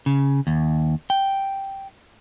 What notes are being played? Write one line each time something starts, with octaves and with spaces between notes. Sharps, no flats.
C#3
D#2
G5